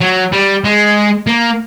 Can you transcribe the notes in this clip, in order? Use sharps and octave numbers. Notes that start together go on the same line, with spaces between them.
F#3
G3
G#3
A#3